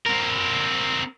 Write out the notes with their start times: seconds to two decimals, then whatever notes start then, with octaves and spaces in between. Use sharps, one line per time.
0.06 C4 A#4